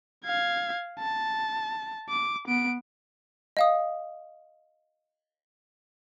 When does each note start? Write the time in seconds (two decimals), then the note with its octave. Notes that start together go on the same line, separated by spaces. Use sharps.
0.25 F5 G#6
0.99 A5
2.09 D6
2.48 B3 D7
3.57 D#5 F5 D#6